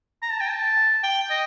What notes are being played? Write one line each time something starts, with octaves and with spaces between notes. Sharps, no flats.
A#5
A5
G5
A5
G5
D#5